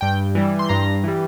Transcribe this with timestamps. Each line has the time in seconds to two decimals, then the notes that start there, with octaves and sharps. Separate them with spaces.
0.01 G2 G5
0.35 E3 G3
0.59 C6
0.69 G2 A#5
1.04 E3 G3